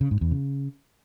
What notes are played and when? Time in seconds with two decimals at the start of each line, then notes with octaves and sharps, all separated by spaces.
0.01 C#3
0.11 G#2
0.21 E2
0.31 C#3